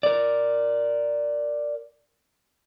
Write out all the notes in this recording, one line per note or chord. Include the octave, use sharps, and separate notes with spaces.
A#4 D5